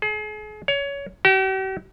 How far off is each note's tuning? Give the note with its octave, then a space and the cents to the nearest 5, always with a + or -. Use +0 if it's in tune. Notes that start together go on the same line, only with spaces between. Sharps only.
G#4 +40
C#5 +20
G4 -45